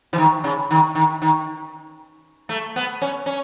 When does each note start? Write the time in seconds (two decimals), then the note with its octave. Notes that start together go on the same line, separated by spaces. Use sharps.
0.13 E3
0.18 D#3
0.44 C#3
0.71 D#3
0.95 D#3
1.22 D#3
2.49 A3
2.76 B3
3.02 C#4
3.26 C#4